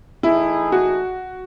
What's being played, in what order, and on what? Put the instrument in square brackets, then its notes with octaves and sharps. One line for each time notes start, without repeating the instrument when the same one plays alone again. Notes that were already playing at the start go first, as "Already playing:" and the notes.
[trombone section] E3 A3 D#4 G#4 [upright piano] E4
[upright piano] F#4